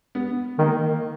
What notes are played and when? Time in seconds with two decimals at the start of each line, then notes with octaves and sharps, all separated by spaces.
0.15 B3
0.59 D#3 A#3